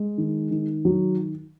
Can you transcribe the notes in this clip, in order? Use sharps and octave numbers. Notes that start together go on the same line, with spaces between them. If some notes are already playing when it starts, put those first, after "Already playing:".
Already playing: G#3
D#3
D#3
F#3